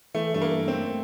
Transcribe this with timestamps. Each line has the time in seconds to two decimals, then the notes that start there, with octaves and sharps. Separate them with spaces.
0.14 E3 A3
0.34 G2 A3
0.41 A#3
0.55 A3
0.68 C4
0.74 A3